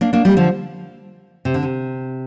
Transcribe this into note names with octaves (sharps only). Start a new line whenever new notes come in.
A#3 D4
A#3 D4
G3 A#3
D3 F3
C3
D3
C3